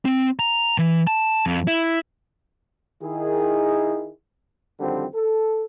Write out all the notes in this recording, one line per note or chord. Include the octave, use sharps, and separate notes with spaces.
C4
A#5
E3
A5
F2
E4
D#3 E4 G#4
F#2 D3 D#3 F3 G3 C4
A4